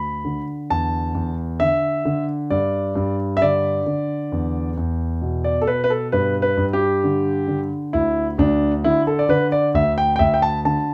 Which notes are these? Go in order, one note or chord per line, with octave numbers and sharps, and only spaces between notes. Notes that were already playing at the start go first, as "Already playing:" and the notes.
Already playing: D2 B5
D3
E2 A5
E2
D3 E5
D3
G2 D5
G2
E5
D3 D5
D3
E2
E2
B2
D5
A4
B2 B4
B4
A4
G2 B4
B4
G2
G4
D3
D3
D2 E4
D2 D4
D3 E4
A4
D5
D3 B4
D5
D2 E5
G5
G5
D2 E5
G5
A5
D3 A5